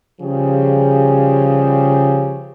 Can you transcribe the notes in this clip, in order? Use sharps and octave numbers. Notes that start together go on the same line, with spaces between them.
C#3 F3 G3 G4 G#4